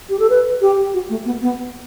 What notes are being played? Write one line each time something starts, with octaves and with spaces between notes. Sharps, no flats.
G4
A4
B4
G4
F#4
A3
B3
B3